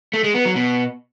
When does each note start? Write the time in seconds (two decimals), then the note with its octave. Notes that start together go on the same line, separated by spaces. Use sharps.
0.13 A3
0.24 G#3
0.35 B3
0.45 F#3
0.56 B2